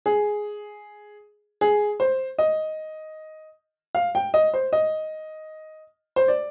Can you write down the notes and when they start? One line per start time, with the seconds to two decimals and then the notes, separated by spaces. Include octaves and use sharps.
0.06 G#4
1.61 G#4
2.00 C5
2.38 D#5
3.95 F5
4.15 G5
4.34 D#5
4.54 C5
4.73 D#5
6.16 C5
6.28 D5